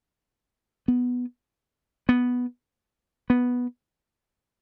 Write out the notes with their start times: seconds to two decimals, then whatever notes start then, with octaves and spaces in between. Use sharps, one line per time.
0.88 B3
2.09 B3
3.30 B3